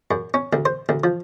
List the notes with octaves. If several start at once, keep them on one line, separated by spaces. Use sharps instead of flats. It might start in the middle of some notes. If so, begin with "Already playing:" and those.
F#2
C#4
D2
C5
D2
F3